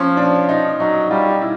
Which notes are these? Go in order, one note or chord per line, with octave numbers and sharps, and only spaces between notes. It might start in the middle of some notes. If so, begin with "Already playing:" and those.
Already playing: F3 C#4
D4
D#4
F#3 D#4
G3 F4
E4